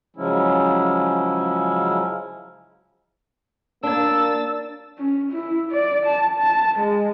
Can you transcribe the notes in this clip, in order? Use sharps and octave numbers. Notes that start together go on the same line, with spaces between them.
C#3 F3 F#3 G#3 C#4 E4
A#3 D4 E6 A6
C#4
E4
D5
A5
A5
G#3